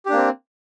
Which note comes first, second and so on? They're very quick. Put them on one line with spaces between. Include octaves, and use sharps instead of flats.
G4 D4 A#3 C4